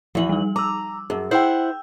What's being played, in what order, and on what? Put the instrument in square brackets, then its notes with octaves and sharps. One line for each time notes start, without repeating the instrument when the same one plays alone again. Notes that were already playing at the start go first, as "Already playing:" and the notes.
[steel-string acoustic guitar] E2 E3 [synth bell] F3 F#7
[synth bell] G3 D#4
[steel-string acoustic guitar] A#5 [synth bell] D6 E6
[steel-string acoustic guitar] F#2 [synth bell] G#4
[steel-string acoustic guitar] E4 C5 F#5 [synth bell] G5 E6 G6